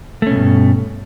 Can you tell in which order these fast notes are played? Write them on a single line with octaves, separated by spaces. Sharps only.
A3 C#4 B2 G2